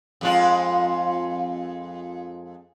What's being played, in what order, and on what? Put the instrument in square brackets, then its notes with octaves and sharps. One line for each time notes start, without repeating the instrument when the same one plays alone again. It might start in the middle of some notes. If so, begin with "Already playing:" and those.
[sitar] F2 G#3 F4